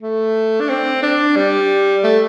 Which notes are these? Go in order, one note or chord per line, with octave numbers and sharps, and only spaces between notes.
A3
D4
C4
D4
G3
A3